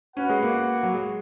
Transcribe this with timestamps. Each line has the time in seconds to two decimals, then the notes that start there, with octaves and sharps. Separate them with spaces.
0.16 C#4 F#4 B4 F#5
0.29 G#3
0.43 A#3
0.83 F#3
0.94 G#3